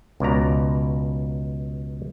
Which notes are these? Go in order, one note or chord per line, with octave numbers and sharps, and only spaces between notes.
C#2 B2 D5 A#5